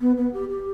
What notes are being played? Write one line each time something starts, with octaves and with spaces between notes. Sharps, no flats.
B3
B3
G4
G4